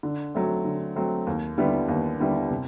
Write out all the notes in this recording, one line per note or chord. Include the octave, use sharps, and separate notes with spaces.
D3
F#3 A3 C4
D3
F#3 A3 C4
D#2
D3 G3 B3 E4
D#2
D3 G3 B3 E4
C3